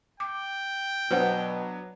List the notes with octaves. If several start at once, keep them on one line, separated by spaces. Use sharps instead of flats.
G5 D6
B2 F#3 B3 D4 B4 C5 F#5